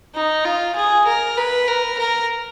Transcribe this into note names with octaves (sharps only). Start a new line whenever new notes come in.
D#4
F4
G#4
A#4
B4
A#4
A#4